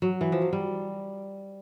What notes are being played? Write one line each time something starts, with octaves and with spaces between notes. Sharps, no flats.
F#3
E3
F3
F#3
G3